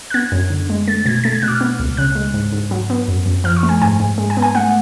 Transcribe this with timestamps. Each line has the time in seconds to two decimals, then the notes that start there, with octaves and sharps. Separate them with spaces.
0.10 F#6
0.14 B3 G#6
0.32 F#2
0.50 D3
0.70 G#3
0.88 A3 A6
1.06 B2 G#6
1.24 A3 A6
1.33 G#6
1.42 B2 F#6
1.48 D6
1.52 F6
1.61 B3
1.80 C#2
1.97 C#3 F#6
2.15 G#3
2.34 G#2
2.52 G#2
2.71 F#3
2.90 B3
3.08 F#2
3.26 F#2
3.44 F3 F6
3.56 C#6
3.63 A3
3.69 G#5
3.82 G#2 G#5
4.00 G#2
4.18 G#3
4.30 G#5
4.37 B3
4.42 G#5
4.55 A3 F#5